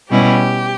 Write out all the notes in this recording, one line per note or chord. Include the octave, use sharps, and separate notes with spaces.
B2 G3 C#4 E4 G4